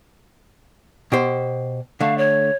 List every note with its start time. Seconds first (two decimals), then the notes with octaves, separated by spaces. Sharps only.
1.12 B2 G4 C5
2.00 D3 A3 F5
2.18 C#5